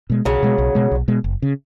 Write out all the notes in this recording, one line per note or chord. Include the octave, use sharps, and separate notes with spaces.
B2 G#3
B1 C#3 F#3
B2 G#3
B1
B2 G#3
B1
B2 G#3
F#1
C#3